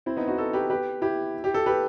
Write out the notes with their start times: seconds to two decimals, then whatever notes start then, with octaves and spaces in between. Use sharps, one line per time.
0.06 C4 E4
0.17 B3 D#4
0.27 D#4 F#4
0.38 F#4 A4
0.53 G4 B4
0.70 G4 B4
1.02 E4 G4
1.44 G4
1.54 A4
1.66 G4 B4